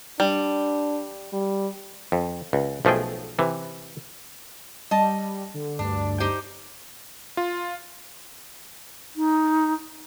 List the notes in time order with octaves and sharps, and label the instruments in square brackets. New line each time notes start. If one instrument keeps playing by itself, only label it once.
[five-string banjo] G3 [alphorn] D4
[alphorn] G3
[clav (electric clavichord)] F2
C#2
B1 F3 A3 G#4 G5
C3 E3
[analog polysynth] G3 [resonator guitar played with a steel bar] D#5 A5
[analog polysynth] D3
[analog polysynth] D2 G2 [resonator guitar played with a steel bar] D4
[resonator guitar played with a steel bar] D#4 G4 C5
[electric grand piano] F4
[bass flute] D#4